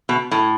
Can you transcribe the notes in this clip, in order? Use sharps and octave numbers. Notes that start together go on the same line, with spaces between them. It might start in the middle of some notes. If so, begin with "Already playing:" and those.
B2
A2